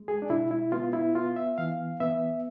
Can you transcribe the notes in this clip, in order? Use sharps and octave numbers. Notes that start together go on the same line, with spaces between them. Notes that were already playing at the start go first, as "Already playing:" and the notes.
Already playing: G#3
G#4
D4
B2 E4
E4
B3 F4
E4
B3 F4
E5
E3 F5
B3 E5